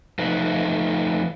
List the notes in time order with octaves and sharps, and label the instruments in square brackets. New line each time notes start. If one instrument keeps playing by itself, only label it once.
[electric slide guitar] F3 A3 D#4 B4